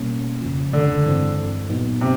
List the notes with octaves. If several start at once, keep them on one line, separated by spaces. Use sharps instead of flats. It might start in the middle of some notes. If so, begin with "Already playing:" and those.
Already playing: B2 G3 A#3 C#4
F2 C#3 F3
D3
G2 E3 G#3 C4
A#2 F#3 B3 D#4
C3